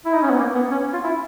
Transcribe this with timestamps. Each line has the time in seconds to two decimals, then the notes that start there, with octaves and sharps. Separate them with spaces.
0.05 E4
0.14 D#4
0.22 C#4
0.29 B3
0.38 A#3
0.54 B3
0.71 C#4
0.93 F4
1.04 E4